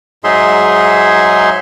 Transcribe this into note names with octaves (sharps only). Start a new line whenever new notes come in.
G#2 F#3 D#4 G#4 E5 C6